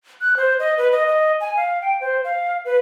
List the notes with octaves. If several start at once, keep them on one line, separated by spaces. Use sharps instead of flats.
F#6
C5
D#5
B4
D#5
D#5
G#5
F5
G5
C5
F5
B4